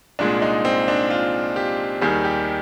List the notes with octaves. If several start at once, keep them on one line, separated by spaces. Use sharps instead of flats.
C2 A#2 G#3 D4
D#4
C4
D4
F4
G4
D#2 D#3 G3 G#4
G4